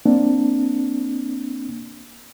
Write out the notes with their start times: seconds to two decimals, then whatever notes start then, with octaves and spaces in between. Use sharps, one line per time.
0.06 A#3 C4 D4